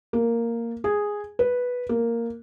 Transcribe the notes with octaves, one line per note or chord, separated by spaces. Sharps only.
A#3
G#4
B4
A#3